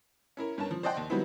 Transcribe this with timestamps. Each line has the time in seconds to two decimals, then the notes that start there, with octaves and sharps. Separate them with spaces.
0.37 C#4 E4 A#4
0.58 G2 C#4 A#4 A5
0.71 F3
0.83 C5 D5 D#5 F#5 G5 C6
0.97 D#2
1.10 D#3 F#3 G3 B3 C4 E4